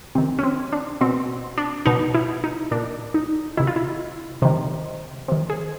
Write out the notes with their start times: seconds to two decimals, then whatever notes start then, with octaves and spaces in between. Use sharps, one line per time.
0.15 C3 D#3 C4
0.39 C#4
0.43 C4
0.72 D4
1.01 B2 C4
1.58 D4
1.86 B2 D#4
2.14 E4
2.44 D#4
2.71 A#2 D4
3.14 D#4
3.57 C3 D#3 E4
3.67 F4
3.76 E4
4.42 C3 D#3
5.28 C3 D#3
5.50 G#4